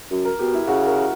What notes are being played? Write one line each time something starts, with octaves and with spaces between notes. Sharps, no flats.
F#2
A#4
B2 G4
E4
C#3 F#4
A#4